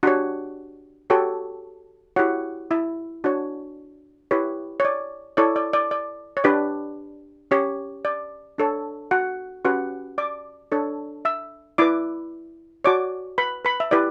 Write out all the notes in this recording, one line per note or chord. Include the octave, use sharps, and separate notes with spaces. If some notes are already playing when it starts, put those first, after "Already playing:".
D4 F#4 G4 C#5 F#5
F#4 G4 A4 C#5 G5
E4 F#4 G4 C#5 F#5
E4 E5
D4 F#4 C#5
E4 G4 B4 C#5
C#5
D5
E4 A4 C#5 D5
D5
D5
D5
C#5
D4 G4 B4 D5
C#4 G4 C#5
D5
D4 A4 C#5
F#4 F#5
C#4 F#4 G4 B4 F#5
D5 D6
D4 A4 C#5
E5 E6
E4 B4 D5 D6
F#4 C#5 D5 D6
B4 B5
B4 B5
E5
E4 G4 B4 D5